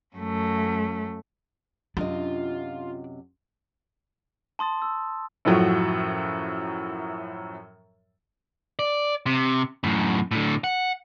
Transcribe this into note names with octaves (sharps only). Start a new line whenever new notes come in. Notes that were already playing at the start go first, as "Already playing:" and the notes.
F#2 A3
F#2 C3 D4 F4 D#5
A5 C6 D#6 A6
D#6 E6
F#2 A2 F3 F#3
D5
C3
F#2 A2
A2 D3
F#5